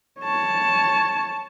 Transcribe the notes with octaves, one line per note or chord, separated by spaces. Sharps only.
C#5 A5